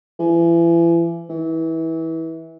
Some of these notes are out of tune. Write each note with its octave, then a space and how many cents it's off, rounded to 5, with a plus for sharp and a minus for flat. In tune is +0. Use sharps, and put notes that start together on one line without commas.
E3 +35
E3 -25